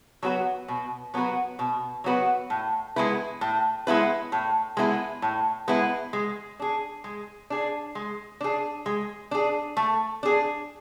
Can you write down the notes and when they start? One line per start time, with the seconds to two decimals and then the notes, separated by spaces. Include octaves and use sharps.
0.23 F#3 B3 F#4 B4
0.68 B2
1.14 F#3 B3 F#4 B4
1.59 B2
2.04 F#3 B3 F#4 B4
2.50 A2
2.96 G#3 B3 E4 B4
3.41 A2
3.87 G#3 B3 E4 B4
4.32 A2
4.77 G#3 B3 E4 B4
5.22 A2
5.68 G#3 B3 E4 B4
6.13 G#3
6.60 D4 G#4
7.04 G#3
7.50 D4 G#4
7.95 G#3
8.41 D4 G#4
8.86 G#3
9.31 D4 G#4
9.77 A3
10.23 D4 G#4